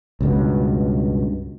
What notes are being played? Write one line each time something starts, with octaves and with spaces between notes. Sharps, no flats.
C#2 G2 B2